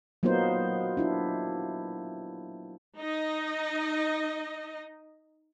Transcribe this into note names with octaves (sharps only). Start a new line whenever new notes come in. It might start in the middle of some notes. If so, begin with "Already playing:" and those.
F#3 A#3 B3 D#4 F4 C5
D4 E4 F4
D#4 D#5